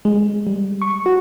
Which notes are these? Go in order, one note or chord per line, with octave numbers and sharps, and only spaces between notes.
G#3
G3
C#6
F#4